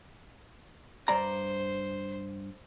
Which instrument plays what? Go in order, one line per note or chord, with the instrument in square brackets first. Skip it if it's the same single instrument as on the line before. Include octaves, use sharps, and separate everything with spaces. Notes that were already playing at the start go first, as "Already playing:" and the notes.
[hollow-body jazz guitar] G2 D5 A#5 [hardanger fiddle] C5